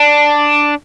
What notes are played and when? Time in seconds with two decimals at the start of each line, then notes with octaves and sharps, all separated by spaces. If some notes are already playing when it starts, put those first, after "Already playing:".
Already playing: D4